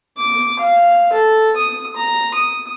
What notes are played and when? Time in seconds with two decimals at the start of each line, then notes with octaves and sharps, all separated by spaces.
0.18 D6
0.59 F5
1.12 A4
1.56 D#6
1.96 A#5
2.34 D#6